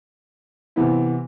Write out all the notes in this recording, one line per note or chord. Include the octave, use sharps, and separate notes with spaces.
C3 E3 B3 E4